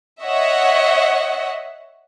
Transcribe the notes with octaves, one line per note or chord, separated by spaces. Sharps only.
C#5 D#5 E5 F#5